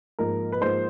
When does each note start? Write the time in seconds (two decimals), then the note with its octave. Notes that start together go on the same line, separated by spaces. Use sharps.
0.19 G#2 F3 A#3 A#4
0.52 B4
0.61 G#2 F3 A#3 C5